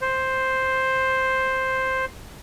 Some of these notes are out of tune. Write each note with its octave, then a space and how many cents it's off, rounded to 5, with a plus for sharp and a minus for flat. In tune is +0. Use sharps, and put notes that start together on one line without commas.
C5 +5